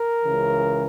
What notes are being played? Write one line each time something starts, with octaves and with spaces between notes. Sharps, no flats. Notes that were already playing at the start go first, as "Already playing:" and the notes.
Already playing: A#4
C#2 C#3 E3